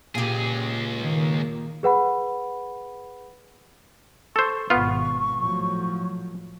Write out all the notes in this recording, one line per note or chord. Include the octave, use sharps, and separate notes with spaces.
C#2 A#2 G4 G#4
D#3 A#3
G#4 B4 F#5 B5
A4 C5 C#6
G#1 B2 B3 F4
A2 F3 F#3